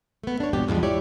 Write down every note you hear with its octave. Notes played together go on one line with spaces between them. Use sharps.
A3 B3
D4 C#5
F2 G#2 B2 B3 G4
E2 D3 F3 G3 G#3
E4 G4 C#5 D5